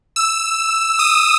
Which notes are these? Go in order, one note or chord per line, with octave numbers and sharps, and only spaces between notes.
E6
D#6